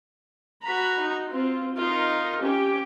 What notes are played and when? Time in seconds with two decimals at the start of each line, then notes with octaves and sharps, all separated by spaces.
0.63 F#4 A#5 B5
1.01 D#4
1.31 C4 F4
1.78 D#4 F4 A#4
2.43 C#4 G4 G5